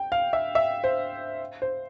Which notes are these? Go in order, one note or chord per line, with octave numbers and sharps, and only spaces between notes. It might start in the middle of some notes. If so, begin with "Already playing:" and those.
Already playing: G5
F5
E5
E5
C5
C5